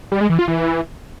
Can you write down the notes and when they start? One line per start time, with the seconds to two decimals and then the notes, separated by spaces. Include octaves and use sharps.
0.12 G3
0.21 G#3
0.30 E3
0.39 F4
0.48 E3